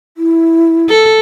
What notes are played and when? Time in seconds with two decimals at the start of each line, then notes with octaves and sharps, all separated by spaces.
0.17 E4
0.90 A4